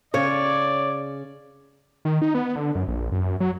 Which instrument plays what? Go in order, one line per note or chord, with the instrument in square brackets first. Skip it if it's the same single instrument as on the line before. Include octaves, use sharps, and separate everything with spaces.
[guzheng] C#3 [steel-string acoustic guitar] C#5 [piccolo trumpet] D5
[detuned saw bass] D#3
D#4
B3
D3
F#2
A#1
F#2
F#2
F#3